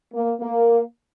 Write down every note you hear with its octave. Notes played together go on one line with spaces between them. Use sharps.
A#3
A#3